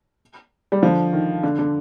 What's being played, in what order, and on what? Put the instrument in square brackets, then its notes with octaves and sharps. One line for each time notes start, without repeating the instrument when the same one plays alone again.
[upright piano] G3
D3 F3
D#3
D3
D3